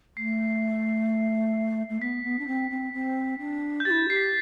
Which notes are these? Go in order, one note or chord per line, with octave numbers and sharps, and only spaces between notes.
A3 C7
A3
B3 B6
B3
D4
C4
C4
C4
D4
G6
G4 A6
E4
G4 C7
B6